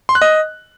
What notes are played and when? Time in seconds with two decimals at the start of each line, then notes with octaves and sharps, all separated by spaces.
0.09 C6
0.15 F#6
0.22 D#5